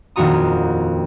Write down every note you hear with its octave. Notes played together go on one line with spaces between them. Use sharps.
D#1 F2 D4 F#4 A#5 D#6